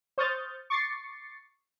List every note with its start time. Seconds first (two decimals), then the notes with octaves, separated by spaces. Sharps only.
0.18 C5 C#6 D#6 F6 G6 A6
0.70 C#6 D6 A6 C7 C#7